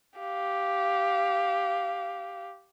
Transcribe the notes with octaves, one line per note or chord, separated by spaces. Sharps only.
G4 F5